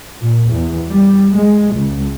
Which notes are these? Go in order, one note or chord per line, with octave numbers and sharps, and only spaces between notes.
A#2
E2
G3
G#3
C#2